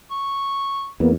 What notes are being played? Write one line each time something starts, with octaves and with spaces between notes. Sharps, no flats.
C#6
E2 A#3 B3